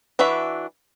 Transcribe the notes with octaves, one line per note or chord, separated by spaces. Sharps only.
E3 D4 F#4 B4 E5